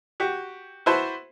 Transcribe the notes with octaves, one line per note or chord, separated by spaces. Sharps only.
F#4 G4
E4 F#4 B4 C5 A5